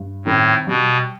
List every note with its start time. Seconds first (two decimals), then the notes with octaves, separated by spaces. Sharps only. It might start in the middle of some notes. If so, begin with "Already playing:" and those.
Already playing: G2
0.25 A2 D#3 G3 C4
0.67 B2 G3